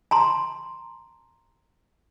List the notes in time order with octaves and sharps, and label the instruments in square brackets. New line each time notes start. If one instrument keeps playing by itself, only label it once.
[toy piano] A5 A#5 C6